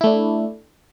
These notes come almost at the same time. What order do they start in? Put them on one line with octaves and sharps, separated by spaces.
E4 A3 D4